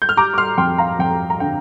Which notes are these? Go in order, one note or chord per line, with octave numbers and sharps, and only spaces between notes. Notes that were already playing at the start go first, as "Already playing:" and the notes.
G6
F6
G3 A#5 D6
D6
C6 F6
F2 G5 C6
F5 A#5
F2 G5
A#5
D3 G5